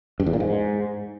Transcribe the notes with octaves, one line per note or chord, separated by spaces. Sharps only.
G2
E2
A#2
G#2